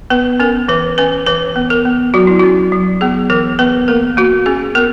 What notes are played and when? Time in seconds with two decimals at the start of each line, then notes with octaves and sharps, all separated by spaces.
0.10 B3 B4
0.40 C#4 A#4
0.68 E3 B4
0.98 C#4 B4
1.26 E3 B4
1.56 B3
1.70 A#4
1.85 B3
2.14 F#3 F#4
2.27 E4
2.39 C#4 F#4
2.72 F#3
3.01 B3 G#4
3.30 E3 A#4
3.59 B3 B4
3.88 A#3 A#4
4.17 A#3 F#4
4.46 C#4 G#4
4.75 B3 A#4